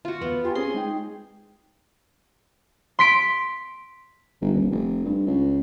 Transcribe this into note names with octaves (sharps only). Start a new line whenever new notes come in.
F4 F#4
E2 B3
F4 G4 G5 G#5
C4 C#4 G#4 C6
G#3 D#4 G5
C6 B6 D7
G1
D#1
F1
G2
C#2